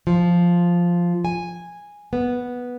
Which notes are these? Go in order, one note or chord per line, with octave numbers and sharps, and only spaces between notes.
F3
G#5
B3